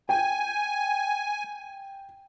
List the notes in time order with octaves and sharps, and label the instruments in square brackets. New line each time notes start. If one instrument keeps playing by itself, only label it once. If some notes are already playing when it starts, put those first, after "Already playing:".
[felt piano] G5 [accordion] G#5